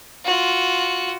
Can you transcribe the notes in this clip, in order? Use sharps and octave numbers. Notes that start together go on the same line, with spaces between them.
F4 F#4